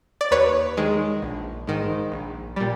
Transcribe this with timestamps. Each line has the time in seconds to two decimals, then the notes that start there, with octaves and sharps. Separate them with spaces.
0.21 D5
0.31 D#2 B4 C#5
0.77 D#3 G#3
1.22 A#1
1.67 G#2 D#3
2.12 A#1
2.56 A#2 G3